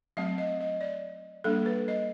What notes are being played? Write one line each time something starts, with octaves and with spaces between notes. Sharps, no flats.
F#3 A3 C4 E5
D#5
D#5
D5
G3 A#3 D4 A4
B4
D#5